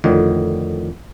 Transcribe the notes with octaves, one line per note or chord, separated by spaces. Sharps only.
F2 A2 D3 D#3